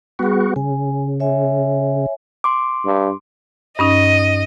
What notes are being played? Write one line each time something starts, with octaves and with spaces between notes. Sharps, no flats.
G3 B3 F#4 G#4
C#3 G#5
C#5 E5 G#5
C6 D6
G2
G2 C#4 D#4 D#5